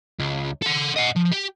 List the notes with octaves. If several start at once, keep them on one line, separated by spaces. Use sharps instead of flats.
C#2
A4 F#5
D#5 F#5
F3
G4